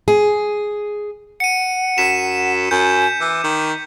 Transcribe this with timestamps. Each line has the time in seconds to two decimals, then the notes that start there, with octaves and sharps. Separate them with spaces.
0.08 G#4
1.40 F#5 C#7 D#7
1.98 F#2 B6 E7
2.71 F#2 G#5 G6
3.21 E3 D6
3.44 D#3